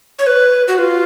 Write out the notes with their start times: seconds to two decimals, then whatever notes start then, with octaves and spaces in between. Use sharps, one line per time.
0.19 C#5
0.27 B4
0.68 F#4
0.78 F4